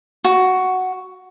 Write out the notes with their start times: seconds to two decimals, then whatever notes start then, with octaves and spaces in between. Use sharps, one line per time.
0.24 F#4